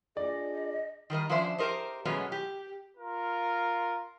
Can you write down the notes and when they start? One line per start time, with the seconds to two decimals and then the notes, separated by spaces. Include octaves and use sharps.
0.17 D4 F4 G#4 D5 D#5
1.10 D#3 G3 A#4 D#5
1.30 F3 C#4 D4 C5 E5
1.58 G4 A#4 C5 D#5
2.05 B2 F#3 G#3 A3 B3 C#4
2.32 G4
2.97 F4 A#4